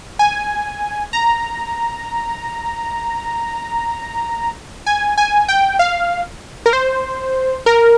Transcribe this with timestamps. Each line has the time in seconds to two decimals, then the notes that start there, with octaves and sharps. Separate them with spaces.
0.19 G#5
1.13 A#5
4.86 G#5
5.18 G#5
5.48 G5
5.79 F5
6.66 A#4
6.73 C5
7.66 A#4